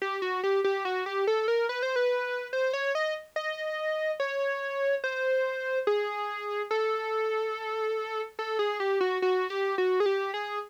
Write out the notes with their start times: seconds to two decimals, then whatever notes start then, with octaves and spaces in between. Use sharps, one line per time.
0.02 G4
0.22 F#4
0.43 G4
0.64 G4
0.85 F#4
1.06 G4
1.27 A4
1.48 A#4
1.69 B4
1.83 C5
1.96 B4
2.53 C5
2.73 C#5
2.95 D#5
3.36 D#5
4.20 C#5
5.04 C5
5.87 G#4
6.71 A4
8.39 A4
8.59 G#4
8.80 G4
9.01 F#4
9.22 F#4
9.50 G4
9.78 F#4
10.00 G#4
10.06 G4
10.34 G#4